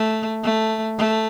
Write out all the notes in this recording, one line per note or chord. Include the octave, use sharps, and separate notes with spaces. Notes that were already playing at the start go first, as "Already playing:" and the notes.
Already playing: A3
A3
A3